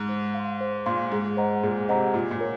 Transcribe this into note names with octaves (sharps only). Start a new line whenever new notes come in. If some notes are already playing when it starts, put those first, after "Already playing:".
Already playing: G#2
C5
F5 C6
C5
A#2 F5 C6
G#2 G#4
C5 D#5 F#5 A#5
A#2 G#4
C3 C5 D#5 F#5 A#5
A#2 F4
A#2
A#4 C#5